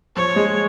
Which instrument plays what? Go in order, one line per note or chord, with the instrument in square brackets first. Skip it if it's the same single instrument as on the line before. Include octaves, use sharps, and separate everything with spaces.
[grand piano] F3 [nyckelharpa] C#5
[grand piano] G#3